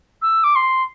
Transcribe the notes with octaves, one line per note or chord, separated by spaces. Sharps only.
E6
D6
C6